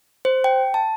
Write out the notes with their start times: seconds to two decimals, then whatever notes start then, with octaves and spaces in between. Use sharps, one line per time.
0.25 C5
0.44 G5
0.74 A5